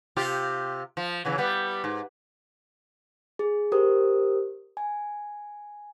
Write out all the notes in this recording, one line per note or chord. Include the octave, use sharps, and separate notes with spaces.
C3 F4 G4
F3
C#3 E3 F#3
G3 B3
G#2
G#4
G4 A#4 C5 D#6
G#5